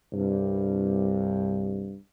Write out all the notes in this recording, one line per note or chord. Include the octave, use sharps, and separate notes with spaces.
C2 G2